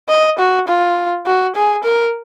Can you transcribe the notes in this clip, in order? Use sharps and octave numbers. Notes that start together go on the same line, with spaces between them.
D#5
F#4
F4
F#4
G#4
A#4